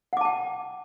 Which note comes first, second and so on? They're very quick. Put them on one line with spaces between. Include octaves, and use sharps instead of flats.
F#5 D6 A5 G5